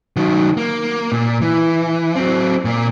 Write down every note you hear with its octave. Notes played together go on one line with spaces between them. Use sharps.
D#3 F#3
A#3
A#2
E3
F#3 C4
A#2 A#3